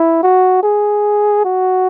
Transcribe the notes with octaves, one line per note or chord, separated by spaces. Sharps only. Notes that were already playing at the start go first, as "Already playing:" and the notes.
Already playing: E4
F#4
G#4
F#4